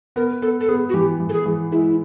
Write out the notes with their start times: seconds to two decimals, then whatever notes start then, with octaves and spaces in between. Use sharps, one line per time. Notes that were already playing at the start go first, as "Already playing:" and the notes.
0.16 B3 A#4
0.42 B3 A4
0.61 A4
0.68 B3 G#4
0.89 F#4
0.94 E3 G4
1.20 E3
1.29 A4
1.33 G#4
1.46 E3
1.72 G#3 E4